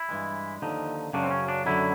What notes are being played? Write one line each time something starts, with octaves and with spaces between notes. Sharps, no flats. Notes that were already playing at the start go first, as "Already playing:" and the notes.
Already playing: E4
G2 E3 G#3
D#2 D3 F3 D#4
F#2 C#3 F#3 D4
C4
C#4
D4
F#2 D3 F#3 E4